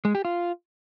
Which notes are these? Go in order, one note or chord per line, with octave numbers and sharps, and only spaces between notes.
G#3
G4
F4